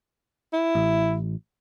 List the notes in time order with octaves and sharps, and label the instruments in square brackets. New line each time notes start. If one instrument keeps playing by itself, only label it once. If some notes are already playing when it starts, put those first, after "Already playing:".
[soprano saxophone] E4
[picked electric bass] A1